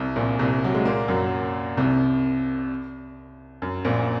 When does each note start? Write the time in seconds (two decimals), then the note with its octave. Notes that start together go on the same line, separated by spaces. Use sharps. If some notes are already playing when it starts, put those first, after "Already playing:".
Already playing: C2 C3
0.16 A#1 A#2
0.39 C2 C3
0.64 F#3
0.74 G#3
0.85 A#2 A#3
1.08 F#2 F#3
1.77 C2 C3
3.62 F#2
3.85 A#1 A#2